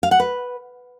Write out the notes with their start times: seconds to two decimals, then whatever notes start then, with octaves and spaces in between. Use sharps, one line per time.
0.03 F5
0.11 F#5
0.20 B4